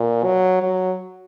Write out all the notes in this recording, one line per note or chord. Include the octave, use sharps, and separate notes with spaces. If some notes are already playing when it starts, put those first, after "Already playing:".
Already playing: A#2
F#3
F#3